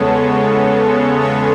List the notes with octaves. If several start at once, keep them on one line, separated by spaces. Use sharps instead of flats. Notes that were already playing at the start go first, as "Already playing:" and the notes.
Already playing: E2 C#3 G#3 B3 A4 C#5
A4 C#5